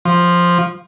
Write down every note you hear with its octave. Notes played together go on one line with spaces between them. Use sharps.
F3